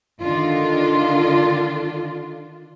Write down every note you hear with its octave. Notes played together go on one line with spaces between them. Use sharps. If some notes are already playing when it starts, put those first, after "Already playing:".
D3 D#3 D4 F4